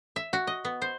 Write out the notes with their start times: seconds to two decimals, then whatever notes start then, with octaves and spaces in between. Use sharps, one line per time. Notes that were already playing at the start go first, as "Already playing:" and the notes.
0.16 E5
0.33 F#4
0.47 D#5
0.65 B3
0.82 C5